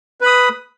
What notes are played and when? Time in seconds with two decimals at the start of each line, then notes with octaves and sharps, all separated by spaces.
0.21 B4
0.24 B5
0.26 D#6